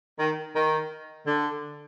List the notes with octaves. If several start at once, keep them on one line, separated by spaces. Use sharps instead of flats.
D#3
D#3
D3